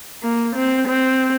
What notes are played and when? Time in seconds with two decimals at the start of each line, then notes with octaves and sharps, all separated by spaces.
0.23 A#3
0.56 C4
0.88 C4